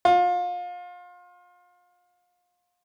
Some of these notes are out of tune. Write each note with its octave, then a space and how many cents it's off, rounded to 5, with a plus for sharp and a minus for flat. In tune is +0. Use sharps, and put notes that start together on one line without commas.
F4 +30